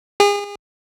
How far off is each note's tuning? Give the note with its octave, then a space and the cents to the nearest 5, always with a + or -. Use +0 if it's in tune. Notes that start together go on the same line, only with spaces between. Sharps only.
G#4 -35